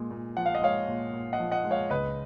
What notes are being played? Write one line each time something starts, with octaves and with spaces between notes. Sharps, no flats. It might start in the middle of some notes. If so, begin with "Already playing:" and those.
Already playing: A#2 G#3
A#2
F3 F#5
F5
D#5
G#3 C#5 F5
A#2
A#2
D#5 F#5
F3
D#5 F#5
G#3
C#5 F5
C#2 B4 D#5